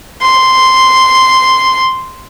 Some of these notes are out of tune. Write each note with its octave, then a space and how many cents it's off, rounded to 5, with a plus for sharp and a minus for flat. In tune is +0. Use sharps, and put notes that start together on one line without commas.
C6 -5